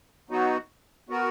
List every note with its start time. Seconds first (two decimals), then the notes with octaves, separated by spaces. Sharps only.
0.30 F#3 B3 D#4 F#4
1.09 B3 F#4 A#4